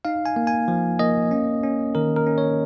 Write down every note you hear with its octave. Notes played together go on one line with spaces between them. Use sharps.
D#4 F5
G#5
A#3
G#5
F3
A#3 D#5
C#4
C#4
D#3 A#4
A#4
C#4
C#5